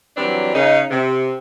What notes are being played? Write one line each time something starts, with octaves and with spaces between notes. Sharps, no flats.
E3 F#3 G3 C4 D4
C#3 D#4
C3